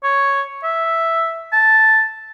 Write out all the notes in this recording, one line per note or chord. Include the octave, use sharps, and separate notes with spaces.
C#5
E5
A5